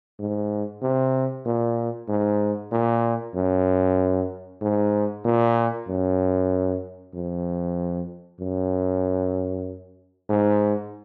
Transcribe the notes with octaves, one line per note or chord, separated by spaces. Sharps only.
G#2
C3
A#2
G#2
A#2
F#2
G#2
A#2
F#2
F2
F#2
G#2